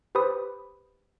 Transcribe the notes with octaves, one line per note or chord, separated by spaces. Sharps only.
G4 B4 C5 B5 D#6